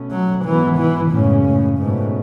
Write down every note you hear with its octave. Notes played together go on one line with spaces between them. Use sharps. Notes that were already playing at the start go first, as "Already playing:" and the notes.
Already playing: B2 A3 C#4
F#3
G#2 E3 F#3 B3
E3
F#2 A2 C#3 G#3 C#4
A2
G#2 B2 A3 C#4